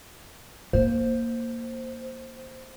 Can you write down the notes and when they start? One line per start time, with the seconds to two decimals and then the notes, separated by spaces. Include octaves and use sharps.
0.73 A#3 C5